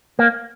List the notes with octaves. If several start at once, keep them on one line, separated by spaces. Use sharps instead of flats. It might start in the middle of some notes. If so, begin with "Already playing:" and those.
A#3